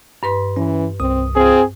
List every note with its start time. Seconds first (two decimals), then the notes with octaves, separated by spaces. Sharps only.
0.23 G2 B4 C6
0.56 E3 C#4
1.00 C2 C4 D#6
1.36 C4 F4 G#4